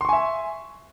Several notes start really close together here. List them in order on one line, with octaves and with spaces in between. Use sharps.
C6 C#6 G#5 E5